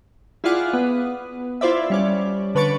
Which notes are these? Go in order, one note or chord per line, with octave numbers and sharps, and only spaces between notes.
E4 F4 G#4 D5 F5 F#5
B3
E4 F4 C5 D5 E5
G3 C#4 D5
D3 B4 C#5 C#6 A6 D7